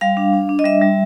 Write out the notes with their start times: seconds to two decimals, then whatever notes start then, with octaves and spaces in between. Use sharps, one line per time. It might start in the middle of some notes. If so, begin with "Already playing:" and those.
0.01 G3 F5
0.17 D4
0.33 D4
0.49 D4
0.59 D#5
0.64 G3 E5
0.81 G3